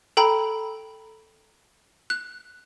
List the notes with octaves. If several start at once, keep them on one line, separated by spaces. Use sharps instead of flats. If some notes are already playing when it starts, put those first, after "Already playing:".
A4 G5 A#5 B5
F#6